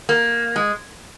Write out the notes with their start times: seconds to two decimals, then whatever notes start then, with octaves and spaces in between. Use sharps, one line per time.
0.09 A#3
0.56 G#3